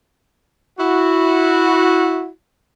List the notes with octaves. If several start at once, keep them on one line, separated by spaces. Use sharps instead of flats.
E4 F#4